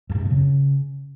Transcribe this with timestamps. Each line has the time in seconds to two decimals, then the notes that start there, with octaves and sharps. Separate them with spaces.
0.10 F#2
0.15 G#2
0.20 F#2
0.25 B2
0.31 C#3